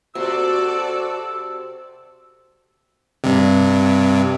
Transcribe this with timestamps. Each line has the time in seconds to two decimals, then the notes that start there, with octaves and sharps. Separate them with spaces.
0.15 C3 F#4 A4 D5 E6
3.24 G2 C3